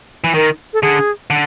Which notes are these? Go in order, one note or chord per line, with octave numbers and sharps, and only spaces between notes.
E3
D#3 A#4
A4
D3 G#4
D3